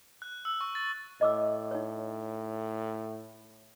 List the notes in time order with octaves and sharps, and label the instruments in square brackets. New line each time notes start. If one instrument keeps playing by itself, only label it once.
[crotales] F#6
E6
C#6
A6
[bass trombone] A2 [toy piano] D#5 D6 E6
[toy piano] D#4 C#5